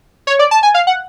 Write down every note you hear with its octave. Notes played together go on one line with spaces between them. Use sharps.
C#5
D5
A5
G#5
F5
F#5